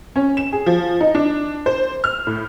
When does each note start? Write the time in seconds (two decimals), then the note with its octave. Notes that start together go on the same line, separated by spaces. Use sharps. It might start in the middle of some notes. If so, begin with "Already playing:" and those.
0.16 C#4
0.37 E7
0.53 G#4
0.66 F3
1.01 D#4
1.15 D4
1.66 C5
2.04 F6
2.27 A2